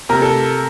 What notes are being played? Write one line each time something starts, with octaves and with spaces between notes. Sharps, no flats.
C3 A#4
A4